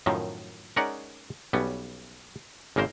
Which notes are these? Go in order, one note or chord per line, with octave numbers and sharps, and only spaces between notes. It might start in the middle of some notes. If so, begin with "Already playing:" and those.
F#2 A2 D#3 F3
G#3 C#4 D#4 A#4 D5 F#5
B1 G3 B3 C#4
G#1 C#3 A#3 A#4 C5